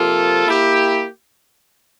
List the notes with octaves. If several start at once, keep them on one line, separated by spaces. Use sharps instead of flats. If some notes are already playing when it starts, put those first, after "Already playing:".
Already playing: C3 F3 A#3 F4 A4
A#3 E4 G4